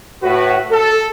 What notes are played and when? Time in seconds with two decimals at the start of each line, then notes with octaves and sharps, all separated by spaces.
0.23 A2 F#4 B4
0.71 A4